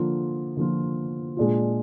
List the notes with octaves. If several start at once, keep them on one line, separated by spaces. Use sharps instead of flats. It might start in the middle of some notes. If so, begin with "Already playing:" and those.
Already playing: D3 F3 A#3 F4
D3 F3 A#3 F4
A#2 G#3 D4 F4